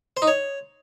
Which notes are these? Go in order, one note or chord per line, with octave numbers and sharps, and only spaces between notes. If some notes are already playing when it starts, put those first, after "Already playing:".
C5
D#4
C#5